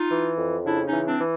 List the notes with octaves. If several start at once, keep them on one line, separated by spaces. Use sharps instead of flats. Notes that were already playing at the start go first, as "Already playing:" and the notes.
Already playing: D#4 F4
E3
F2
C#3 D4 E4
C#4 D#4
E3
C4 D4
E3